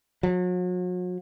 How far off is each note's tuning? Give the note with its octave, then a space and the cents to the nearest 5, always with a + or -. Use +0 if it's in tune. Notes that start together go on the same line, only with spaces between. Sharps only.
F#3 -40